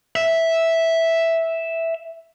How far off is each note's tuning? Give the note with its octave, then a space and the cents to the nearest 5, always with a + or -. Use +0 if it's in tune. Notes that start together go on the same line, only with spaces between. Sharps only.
E5 -5